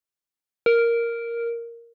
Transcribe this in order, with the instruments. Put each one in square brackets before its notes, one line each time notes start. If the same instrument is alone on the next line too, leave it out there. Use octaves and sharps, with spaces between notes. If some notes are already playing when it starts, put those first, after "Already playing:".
[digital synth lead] A#4